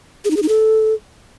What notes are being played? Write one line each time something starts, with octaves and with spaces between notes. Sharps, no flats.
G#4
D#4
G#4
D#4
A4